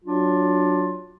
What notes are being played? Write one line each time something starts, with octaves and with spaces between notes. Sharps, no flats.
F#3 D4 F4 F#4